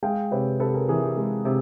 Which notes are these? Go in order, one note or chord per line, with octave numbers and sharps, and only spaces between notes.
G#3 F5 G5
C3 B4 C#5
C3 A4 B4
G#4 A#4
E3 G#4 A#4
G4
G#3
C3